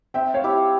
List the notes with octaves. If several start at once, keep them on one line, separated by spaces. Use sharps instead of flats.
C4 E5 G5
C#5 F5
E4 G4